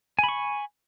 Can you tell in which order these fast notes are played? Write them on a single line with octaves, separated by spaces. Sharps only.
G#5 B5 C#6